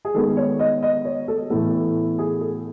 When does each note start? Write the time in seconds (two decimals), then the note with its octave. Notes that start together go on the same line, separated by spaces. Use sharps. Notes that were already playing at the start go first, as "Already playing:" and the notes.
0.05 G#4
0.14 D#3 G#3 B3 A4
0.37 C#5
0.59 D#5
0.83 D#5
1.05 C#5
1.28 A4
1.50 A2 E3 B3 A4
2.18 G#4
2.41 A4